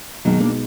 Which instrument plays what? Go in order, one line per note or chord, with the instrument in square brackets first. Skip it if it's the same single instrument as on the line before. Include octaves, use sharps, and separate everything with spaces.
[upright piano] B1 B2 G#3 B3 D#4 [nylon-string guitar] D#3 F#3
[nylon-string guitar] A#3 D4